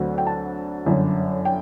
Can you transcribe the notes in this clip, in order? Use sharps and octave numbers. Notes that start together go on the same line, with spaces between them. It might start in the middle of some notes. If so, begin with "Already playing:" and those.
Already playing: D2 D3 F#3 A3 C4
G5
A5
G1 F#2 D3
G5